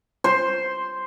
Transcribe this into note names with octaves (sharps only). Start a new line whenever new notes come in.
C5